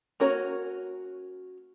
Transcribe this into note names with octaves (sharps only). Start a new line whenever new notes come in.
A#3 C#4 F#4 A#4 C#5